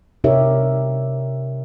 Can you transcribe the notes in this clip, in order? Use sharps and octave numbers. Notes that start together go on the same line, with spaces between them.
C3 D#4 G4 A#4 C#5 E5